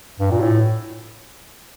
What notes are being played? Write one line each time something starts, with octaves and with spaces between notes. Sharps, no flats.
G2
A#2
A2